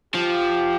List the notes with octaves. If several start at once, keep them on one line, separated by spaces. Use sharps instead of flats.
F3 G4